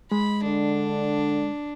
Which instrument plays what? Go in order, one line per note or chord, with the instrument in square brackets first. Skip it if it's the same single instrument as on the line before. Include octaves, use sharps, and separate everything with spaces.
[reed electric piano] G#3 [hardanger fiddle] B5
[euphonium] D3 [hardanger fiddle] D4